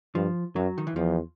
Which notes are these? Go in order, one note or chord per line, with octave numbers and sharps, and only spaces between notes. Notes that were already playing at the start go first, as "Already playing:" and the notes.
G2 F3
F#2 F#3
D#3
E3
E2 F3